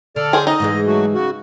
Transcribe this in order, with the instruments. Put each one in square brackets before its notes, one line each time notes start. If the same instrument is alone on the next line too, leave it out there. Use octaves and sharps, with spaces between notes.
[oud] D3 [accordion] A4 D5 F6
[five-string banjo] G#4 C5
[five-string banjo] D#4 [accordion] D#5
[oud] G#2 E3 G#3
[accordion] F#3 A3 F#4
C#3 F#4